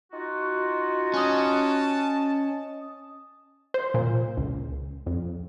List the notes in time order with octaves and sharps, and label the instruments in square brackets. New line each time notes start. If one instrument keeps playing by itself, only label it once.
[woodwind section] D#4 F4 F#4
[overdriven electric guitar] C#4 [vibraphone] D#5 D#6 [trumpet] A5
[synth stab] C5
A#2
C#2
F2